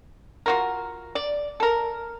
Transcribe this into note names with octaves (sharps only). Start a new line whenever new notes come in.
F4 F#4 A#4
D5
A4 A#4